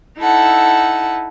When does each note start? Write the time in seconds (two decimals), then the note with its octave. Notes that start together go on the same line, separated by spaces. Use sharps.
0.18 D#4 E4 A4 F#5